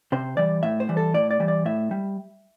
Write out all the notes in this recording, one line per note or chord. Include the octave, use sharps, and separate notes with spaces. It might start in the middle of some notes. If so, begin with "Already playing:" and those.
C3 C5
E3 G3 D5
A2 E5
C5
E3 G3
A4
A2 D5
D5
E3 G3
D5
A2 E5
G3